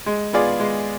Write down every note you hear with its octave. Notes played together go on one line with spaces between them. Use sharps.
G#3
B3 F4 G#4 D5
G#3